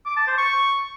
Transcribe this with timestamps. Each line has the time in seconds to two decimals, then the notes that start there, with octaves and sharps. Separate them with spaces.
0.06 D6
0.17 A5
0.27 C5
0.38 C#6